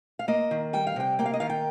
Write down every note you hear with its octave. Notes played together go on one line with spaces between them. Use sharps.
F5
A#3 D#5
D#3
G3 G5
F5
C3 G5
A#3 G5
F5
D#5
D#3 F5
G5